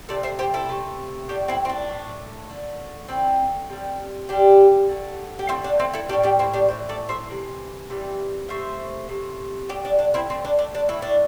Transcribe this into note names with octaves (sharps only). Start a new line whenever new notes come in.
C3 A3 A4 D5
C5 E5
G4 C5
E4 A4
C3 A3
A2 A3 D4 G4
C4 E4
C4
D4
A2 A3
D3 A3
D3 A3 C4 E4
C3 G3
C3 G3 D4 G4
D3 A3
G4
D3 A3 C4 E4
D4
C4 E4
E4 A4
A2 E3 G3 D4 G4
D4 G4
C4 E4
D4 G4
A2 E3 C5
A4 D5
C5 E5
C3 E3
C3 E3 G3
C3 A3 C5 E5
C3 A3
D3 A3 D4 G4
D4
D4
C4 E4
D3 A3 C4
D4
D4
D4
A2 A3 E4
D4